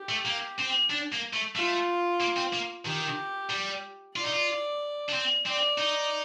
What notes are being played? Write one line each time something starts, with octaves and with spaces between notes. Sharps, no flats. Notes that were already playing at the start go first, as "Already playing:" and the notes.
Already playing: G4
A3
A#3
C4
D4
A#3
A3
A3 F4
A#3
C4
A#3
D#3 G4
G3
F4 D5
D#4
F4
D4
C4
C4 D5
D#4